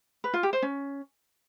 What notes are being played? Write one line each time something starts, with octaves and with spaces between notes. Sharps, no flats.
B4
F4
G4
C5
C#4